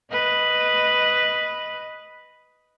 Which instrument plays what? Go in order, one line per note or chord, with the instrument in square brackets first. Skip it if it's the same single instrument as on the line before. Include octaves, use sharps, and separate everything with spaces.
[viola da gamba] B4 D#5